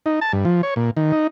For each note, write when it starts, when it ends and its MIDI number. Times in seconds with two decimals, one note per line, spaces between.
0.06 0.20 63
0.21 0.32 81
0.33 0.45 43
0.45 0.62 53
0.63 0.74 73
0.76 0.91 46
0.97 1.12 51
1.12 1.27 63